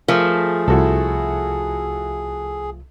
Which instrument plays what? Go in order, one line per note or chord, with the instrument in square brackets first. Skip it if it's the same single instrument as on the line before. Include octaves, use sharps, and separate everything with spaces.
[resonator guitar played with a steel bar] F3 A3 [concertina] G#4 [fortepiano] A#4
[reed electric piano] C2 [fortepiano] E4 F#4 A4